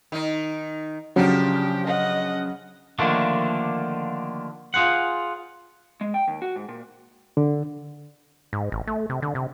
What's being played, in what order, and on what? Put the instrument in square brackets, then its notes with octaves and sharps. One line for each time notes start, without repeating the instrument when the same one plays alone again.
[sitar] D#3 D#4
[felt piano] C#3 [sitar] F3 D4 [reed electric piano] F#3 [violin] G4
[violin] D#5 F#5
[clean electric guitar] D3 D#3 F3 A3 A#3 D4
F4 G#4 C5 F#5
G#3
G5
D#2
F#4
G#2
A#2
[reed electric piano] D3
[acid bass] G#2
A1
A3
C3
D3
C3